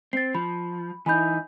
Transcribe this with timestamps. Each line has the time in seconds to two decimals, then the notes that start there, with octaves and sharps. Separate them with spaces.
0.13 C4 A6 C7
0.35 F3 B5
1.06 E3 D#4 E4 G#5 B5 G6